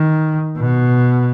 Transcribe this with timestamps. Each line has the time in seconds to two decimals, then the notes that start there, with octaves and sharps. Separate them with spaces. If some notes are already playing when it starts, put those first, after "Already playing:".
Already playing: D#3
0.58 B2